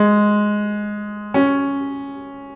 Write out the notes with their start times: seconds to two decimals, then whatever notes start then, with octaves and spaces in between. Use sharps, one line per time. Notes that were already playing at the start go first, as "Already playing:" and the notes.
Already playing: G#3
1.34 C#4